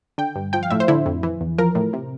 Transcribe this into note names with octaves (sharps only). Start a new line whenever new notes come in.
D3 G5
G2
F3 G5
F5
A2 E5
C5
D3 E4
F2
E3
E2
F3 A#4
A2
C3